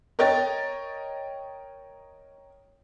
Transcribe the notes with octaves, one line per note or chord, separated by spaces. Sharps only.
A#4 C#5 D#5 G5 A6